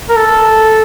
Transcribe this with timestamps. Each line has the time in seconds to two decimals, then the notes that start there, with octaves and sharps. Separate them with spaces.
0.09 A#4
0.16 A4